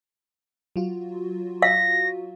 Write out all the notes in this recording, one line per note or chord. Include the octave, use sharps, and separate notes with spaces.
F#3 F4 F#4
F5 A#6